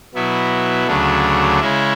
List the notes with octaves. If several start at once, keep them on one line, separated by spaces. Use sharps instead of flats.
B2 F#3 B3 E4
D2 C#3 F#3 A3 D4
C#3 G#3 C#4 E4